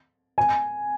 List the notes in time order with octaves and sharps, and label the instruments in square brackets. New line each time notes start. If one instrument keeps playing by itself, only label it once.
[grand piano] G#5